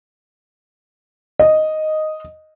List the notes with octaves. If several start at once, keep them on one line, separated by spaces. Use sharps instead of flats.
D#5